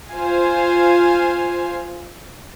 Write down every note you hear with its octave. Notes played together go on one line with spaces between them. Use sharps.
F4 C5 F5 G#5